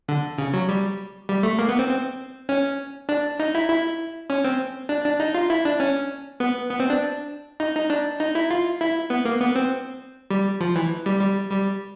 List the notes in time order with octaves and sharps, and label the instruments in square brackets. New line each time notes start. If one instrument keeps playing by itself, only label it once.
[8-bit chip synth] D3
C#3
F#3
G3
G3
A3
A#3
B3
C4
C4
C#4
D4
D#4
E4
E4
C#4
C4
D4
D4
D#4
F4
E4
D4
C#4
B3
B3
C4
D4
D#4
D#4
D4
D#4
E4
F4
E4
B3
A#3
B3
C4
G3
F3
E3
G3
G3
G3